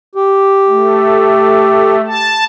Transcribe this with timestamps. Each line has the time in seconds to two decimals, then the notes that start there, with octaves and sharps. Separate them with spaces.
0.15 G4
0.67 A3
2.07 A5